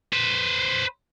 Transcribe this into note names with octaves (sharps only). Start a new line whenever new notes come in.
B4 C5